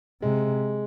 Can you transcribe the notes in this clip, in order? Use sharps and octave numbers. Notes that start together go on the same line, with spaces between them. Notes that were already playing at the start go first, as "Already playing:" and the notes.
C3 G#3